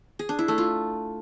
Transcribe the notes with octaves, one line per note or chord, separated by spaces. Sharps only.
G#4
D4
E4
A3
F4